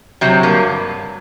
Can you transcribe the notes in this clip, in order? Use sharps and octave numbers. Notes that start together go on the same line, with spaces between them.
C3 F#3 C4
G2 A#3